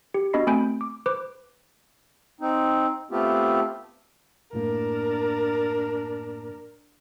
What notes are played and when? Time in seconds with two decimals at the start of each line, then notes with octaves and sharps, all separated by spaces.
0.14 G4
0.33 B3 D4 F#4 D#5 B5 C7
0.47 A3 C4 G#5 B5 G6 D7
0.81 D6
1.06 B4 C5 D6
2.41 C4 D#4
3.11 A3 B3 C4 F4 G4
4.53 F#2 A2 A#3 D4 A#4